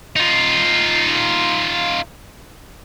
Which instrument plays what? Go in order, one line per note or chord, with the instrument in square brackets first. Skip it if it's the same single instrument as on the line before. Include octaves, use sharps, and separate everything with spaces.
[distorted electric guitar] D#4 F4